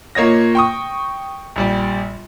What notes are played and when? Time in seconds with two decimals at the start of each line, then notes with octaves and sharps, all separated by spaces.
0.15 A#2 A#3 C#5 D#5 A#6
0.55 G5 C#6 D#6
1.56 A#1 G3 D5